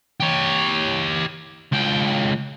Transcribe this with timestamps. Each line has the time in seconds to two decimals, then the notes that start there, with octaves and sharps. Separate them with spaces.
0.20 G4 C#5
1.72 C#2 G5